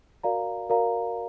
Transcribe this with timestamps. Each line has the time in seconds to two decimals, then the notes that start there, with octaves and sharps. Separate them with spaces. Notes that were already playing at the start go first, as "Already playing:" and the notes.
0.23 F#4 A#4 D5 F5 A#5
0.70 F#4 A#4 D5 F5 A#5